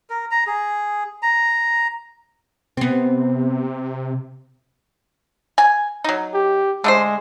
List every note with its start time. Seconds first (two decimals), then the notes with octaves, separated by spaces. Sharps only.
0.10 A#4
0.31 A#5
0.47 G#4
1.23 A#5
2.77 C3 B3 C4
5.58 G#5
6.04 F#3 D#4
6.34 G4
6.84 D3 G#3 A3 C5